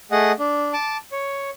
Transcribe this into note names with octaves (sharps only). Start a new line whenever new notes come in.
A3 G#4 D#5 F#5
D4
A5 D6
C#5